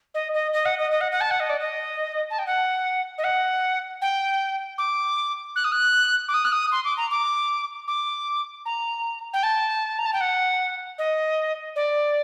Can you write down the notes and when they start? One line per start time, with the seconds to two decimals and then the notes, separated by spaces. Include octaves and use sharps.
0.14 D#5
0.33 D#5
0.53 D#5
0.65 F#5
0.78 D#5
0.91 D#5
1.00 F#5
1.11 F#5
1.20 A5
1.30 F#5
1.40 D#5
1.49 D5
1.60 D#5
2.30 A5
2.38 G5
2.46 F#5
3.18 D#5
3.24 F#5
4.01 G5
4.78 D6
5.55 F#6
5.64 D#6
5.72 F#6
6.28 D6
6.33 D#6
6.44 F#6
6.52 D#6
6.72 C6
6.84 D6
6.97 A#5
7.10 D6
7.87 D6
8.65 A#5
9.33 G5
9.43 A5
9.98 A#5
10.05 A5
10.13 G5
10.20 F#5
10.98 D#5
11.75 D5